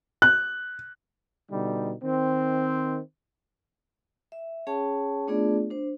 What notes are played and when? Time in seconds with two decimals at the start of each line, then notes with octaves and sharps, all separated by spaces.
0.22 F#6
1.51 B2 D3 G3 D#4
2.03 D#3 C4
4.32 E5
4.67 C#4 G#4 C#5 G5 A5 C#6
5.28 A3 B3 D4 F4 G#4 D5
5.70 D4 C5